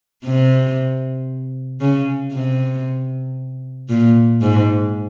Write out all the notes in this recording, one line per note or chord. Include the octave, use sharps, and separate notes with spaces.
C3
C#3
C3
A#2
G#2